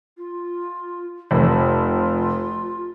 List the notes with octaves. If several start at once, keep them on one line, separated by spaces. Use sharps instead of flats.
F4
F1 F4